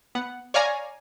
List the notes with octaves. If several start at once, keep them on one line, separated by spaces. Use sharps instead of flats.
B3 F#5
C#5 D5 F5 G#5 A#5